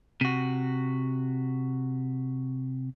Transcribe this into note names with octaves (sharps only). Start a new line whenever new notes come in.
C3 F#4